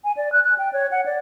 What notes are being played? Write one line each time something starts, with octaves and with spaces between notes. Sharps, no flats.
G#5
D5
F#6
F#6
G5
C#5
F#5
D5